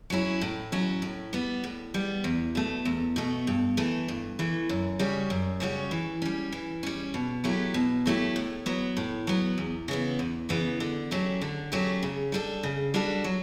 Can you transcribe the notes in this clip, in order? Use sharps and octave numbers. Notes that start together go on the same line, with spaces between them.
F#3 C#4 E4
A2
F#3 C#4 E4
A2
G3 B3
A2
G3 B3
E2
B2 A3
E2
B2 A3
G2
E3 A3
G2
E3 A3
F#2
C#3 G3 C#4 F#4
F#2
C#3 G3 C#4 F#4
E3
G3 C#4
E3
G3 C#4
B2
F#3 A3 E4 G4
B2
F#3 A3 E4 G4
A2
F#3 B3
A2
F#3 B3
E2
C#3 E3 B3
E2
C#3 E3 B3
D3
F#3 A3 C#4 G4
D3
F#3 A3 C#4 G4
C#3
G3 D4 F#4 A4
C#3
G3 D4 F#4 A4
F#3